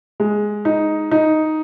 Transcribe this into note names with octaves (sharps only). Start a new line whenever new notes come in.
G#3
D#4
D#4